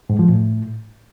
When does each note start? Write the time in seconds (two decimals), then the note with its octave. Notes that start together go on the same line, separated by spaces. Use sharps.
0.10 G#2
0.19 F3
0.29 A2